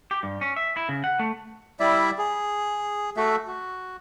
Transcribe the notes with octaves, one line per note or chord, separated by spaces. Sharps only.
G4
G2
C#4
E5
E4
C#3
F#5
A3
G3 E4 D5 E5
G#4
A3 F#4 A4 E5
F#4